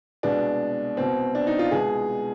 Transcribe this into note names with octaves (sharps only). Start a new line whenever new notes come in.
C2 B2 G#3 B3 D4
C2 B2 B3 C4
D4
D#4
F4
C2 B2 G#3 B3 G#4